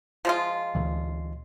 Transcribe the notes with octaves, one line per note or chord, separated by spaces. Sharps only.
F3 G#3 F4
D2 A#2 E3